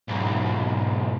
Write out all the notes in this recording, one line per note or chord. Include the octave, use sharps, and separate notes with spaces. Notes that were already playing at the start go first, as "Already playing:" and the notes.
B1 G#2